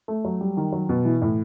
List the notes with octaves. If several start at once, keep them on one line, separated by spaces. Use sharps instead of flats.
A3
F#3
G3
D#3
F#3
B2
E3
A2